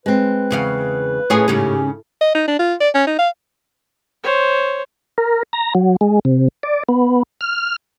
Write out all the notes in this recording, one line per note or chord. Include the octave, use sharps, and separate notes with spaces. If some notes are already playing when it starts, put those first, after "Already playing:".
G#3 C4 B4
E2 C#3 F5
A2 C#4 F4 G#4
G#2 C#3 C#4 G4
D#5
D#4
D4
F4
D5
C#4
D#4
F5
C5 C#5
A#4
A#5
F#3
G#3
C3
D5
B3
F6